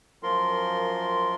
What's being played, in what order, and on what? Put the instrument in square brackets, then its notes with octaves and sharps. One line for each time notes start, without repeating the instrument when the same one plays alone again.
[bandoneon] F#2 F3 F4 A#4 C6